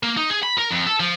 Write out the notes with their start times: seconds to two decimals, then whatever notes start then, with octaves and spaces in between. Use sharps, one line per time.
0.03 A#3
0.17 D#4
0.30 G#4
0.42 B5
0.58 A#4
0.71 F2
0.86 A4
1.00 F3